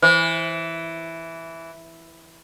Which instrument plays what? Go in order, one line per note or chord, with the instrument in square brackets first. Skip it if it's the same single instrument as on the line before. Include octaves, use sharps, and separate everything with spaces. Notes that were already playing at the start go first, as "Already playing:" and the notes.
[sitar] E3 [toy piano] C5